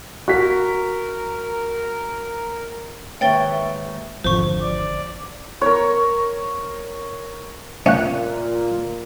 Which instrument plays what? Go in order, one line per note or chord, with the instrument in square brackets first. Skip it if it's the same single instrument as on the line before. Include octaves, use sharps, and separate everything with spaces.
[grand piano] F#4 B6 [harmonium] A#4
[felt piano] D#2 G#2 [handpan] B4 C#5 [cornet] E5 [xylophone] G5 A6 G7
[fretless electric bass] G#1 G#2 D3 [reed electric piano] F2 F3 [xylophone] C5 C#6
[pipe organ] D5
[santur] A#4 C#5
[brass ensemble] A#2 [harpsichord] C#4 [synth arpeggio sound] E5 F5 F#6